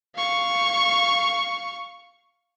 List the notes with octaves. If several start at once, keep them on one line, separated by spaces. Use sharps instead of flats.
F5 C#6